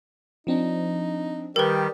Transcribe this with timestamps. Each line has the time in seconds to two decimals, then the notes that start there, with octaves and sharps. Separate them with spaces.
0.47 F3 C4 D4 D#4
1.56 D#3 G3 G4 A#4 B4